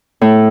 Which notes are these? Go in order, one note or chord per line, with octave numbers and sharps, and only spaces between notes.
A2